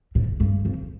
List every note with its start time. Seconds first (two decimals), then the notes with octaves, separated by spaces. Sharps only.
0.15 A2
0.40 G2
0.65 F2